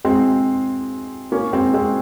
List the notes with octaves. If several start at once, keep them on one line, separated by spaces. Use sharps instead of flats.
G#3 C4
A#3 C#4
G#3 C4
G#3 C4